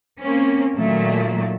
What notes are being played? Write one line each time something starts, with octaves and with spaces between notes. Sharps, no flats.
A#3 C4 C#4
A#2 D#3 F#3 A3 A#3